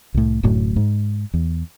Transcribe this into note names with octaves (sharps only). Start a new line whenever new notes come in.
C2 A2
D1 F#2 A2 F#3
G#2
E2